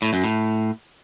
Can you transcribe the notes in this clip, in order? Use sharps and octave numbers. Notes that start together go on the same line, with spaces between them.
A2
F#2
A2